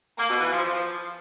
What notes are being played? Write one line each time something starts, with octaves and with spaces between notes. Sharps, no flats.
A#3
B2
E3
F3
F3